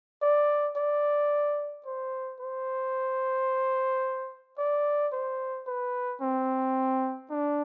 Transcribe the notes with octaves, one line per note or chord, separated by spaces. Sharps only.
D5
D5
C5
C5
D5
C5
B4
C4
D4